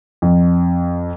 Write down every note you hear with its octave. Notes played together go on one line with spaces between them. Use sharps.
F2